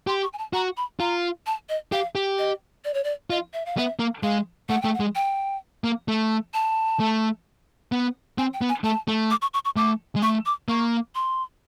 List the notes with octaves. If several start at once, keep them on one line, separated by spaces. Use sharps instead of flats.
G4 C6
C#6
G#5
A5
F#4 A#5
B5
F4 A#5
A5
D#5
G4 F5
G4
D#5
D5
C#5
D5
F4 D#5
E5
F5
B3 E5
A#3
G#3 F5
A3 F#5
A3 G5
F#5
G#3
G5
A#3
A3
A5
A3
B3
C4 G#5
G5
B3
G#5
A3 A5
A3
D6
C#6
C#6
C#6
A3 D6
G#3
A3 C#6
D6
A#3 C#6
C6